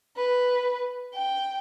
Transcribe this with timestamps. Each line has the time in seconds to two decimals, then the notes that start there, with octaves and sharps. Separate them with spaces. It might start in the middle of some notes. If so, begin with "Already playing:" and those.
0.17 B4
1.14 G5